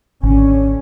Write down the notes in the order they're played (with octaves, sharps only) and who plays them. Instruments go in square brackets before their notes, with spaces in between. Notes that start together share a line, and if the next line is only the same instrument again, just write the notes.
[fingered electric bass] G#1 [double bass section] D3 C#4